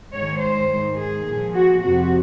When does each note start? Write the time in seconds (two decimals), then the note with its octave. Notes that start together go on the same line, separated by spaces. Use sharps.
0.13 G#2 D#3 C#5
0.41 C5
0.70 G#2 D#3
0.98 G#4
1.27 A#2 F3
1.54 F#4
1.82 F2 C3 F3 F#4